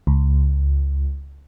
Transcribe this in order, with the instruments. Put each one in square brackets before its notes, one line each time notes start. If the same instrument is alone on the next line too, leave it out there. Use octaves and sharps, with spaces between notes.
[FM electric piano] C#2